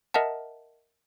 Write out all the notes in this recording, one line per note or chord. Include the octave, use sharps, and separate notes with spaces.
A#4 D#5 E5 F#5 A5